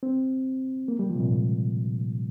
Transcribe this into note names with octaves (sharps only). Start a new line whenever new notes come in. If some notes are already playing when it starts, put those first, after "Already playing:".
C4
A#3
G3
F3
C3
A#2
G#2